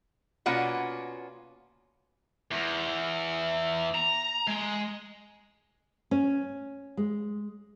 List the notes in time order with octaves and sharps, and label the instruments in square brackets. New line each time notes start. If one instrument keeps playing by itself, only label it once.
[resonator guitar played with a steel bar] B2 A#3 C#4 F4 D5 F#5
[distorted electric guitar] E2
A#5
G#3
[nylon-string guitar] C#4
G#3